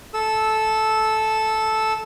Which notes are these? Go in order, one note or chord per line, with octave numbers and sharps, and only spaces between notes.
A4 E6